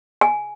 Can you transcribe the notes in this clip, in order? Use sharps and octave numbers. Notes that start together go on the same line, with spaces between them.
G#5